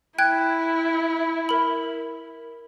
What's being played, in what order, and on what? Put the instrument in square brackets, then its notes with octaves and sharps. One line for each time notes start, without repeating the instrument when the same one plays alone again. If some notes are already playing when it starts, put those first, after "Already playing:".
[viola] E4 [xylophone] G5 F#6 G#6
[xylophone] A#4 B5